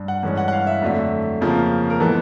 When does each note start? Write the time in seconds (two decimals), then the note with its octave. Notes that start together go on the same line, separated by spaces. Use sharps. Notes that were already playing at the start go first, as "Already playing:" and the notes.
Already playing: G2
0.08 F#5
0.23 G2 E3 G#3 C#4
0.37 F#5
0.48 F#5
0.52 F5
0.67 E5
0.82 F2 D3 F#3 A3
1.41 F2 C#3 F3 A#3
1.90 A#4
2.00 E3 G#3 B3 A4